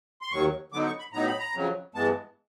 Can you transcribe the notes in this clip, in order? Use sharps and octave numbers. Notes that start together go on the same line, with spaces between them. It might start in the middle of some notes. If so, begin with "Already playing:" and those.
C6
D#2 D#3 F#3 C#6
D3 F#3 B3 D#4 D6
C#6
B5
A2 F#3 B3 D#4 A#5
B5
A#5
F2 C#3 F#3
G2 E3 G#3 B3 A5